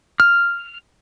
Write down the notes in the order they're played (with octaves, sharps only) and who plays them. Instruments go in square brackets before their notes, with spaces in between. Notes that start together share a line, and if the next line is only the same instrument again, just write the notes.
[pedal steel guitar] F6